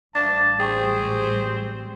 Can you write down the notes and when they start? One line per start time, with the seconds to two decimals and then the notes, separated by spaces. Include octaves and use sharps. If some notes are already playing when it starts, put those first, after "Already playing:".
0.15 A1 G3 D4 F5 A5 A6
0.60 C4 G#4 C5 G5 C#6